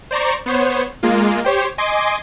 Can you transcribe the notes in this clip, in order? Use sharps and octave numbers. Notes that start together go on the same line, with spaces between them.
C5 D5 A#5 C#6
B3 C5 C#5
G#3 A#3 F4
G4 C5 C#5
D#5 G#5 C6 D6